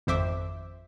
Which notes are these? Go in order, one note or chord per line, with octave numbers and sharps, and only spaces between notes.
G#1 F2 C5 E5 D6